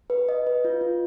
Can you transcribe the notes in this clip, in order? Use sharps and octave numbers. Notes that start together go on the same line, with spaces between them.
B4
D#5
B4
F4
F4